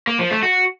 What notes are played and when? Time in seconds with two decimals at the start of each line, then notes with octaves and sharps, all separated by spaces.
0.07 A#3
0.19 F3
0.31 A3
0.43 F#4